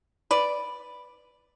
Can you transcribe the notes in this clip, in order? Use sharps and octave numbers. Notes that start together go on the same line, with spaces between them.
B4 D5